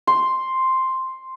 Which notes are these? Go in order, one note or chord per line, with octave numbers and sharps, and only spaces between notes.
C6